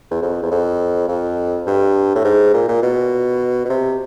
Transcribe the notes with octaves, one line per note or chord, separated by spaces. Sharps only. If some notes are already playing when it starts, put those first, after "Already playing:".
E2
F2
E2
F2
F2
G2
A2
G#2
A#2
A#2
B2
B2
C3